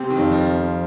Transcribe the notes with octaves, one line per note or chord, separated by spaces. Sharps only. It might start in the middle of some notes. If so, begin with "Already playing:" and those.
Already playing: C3 C4
D#3
F2
F3